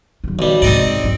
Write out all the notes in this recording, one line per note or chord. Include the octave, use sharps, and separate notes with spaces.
D#3 F#3
B1 G3
G#2 C3 C4 D#4 D5
F#1 C#3